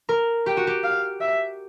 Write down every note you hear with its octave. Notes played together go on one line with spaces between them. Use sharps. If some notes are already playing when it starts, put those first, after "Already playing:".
A#4
G4 G5
F#4
G4
F5
E5